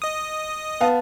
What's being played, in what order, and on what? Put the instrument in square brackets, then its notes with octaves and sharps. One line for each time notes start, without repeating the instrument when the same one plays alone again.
[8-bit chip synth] D#5 D#6
[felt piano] B3 F5 A5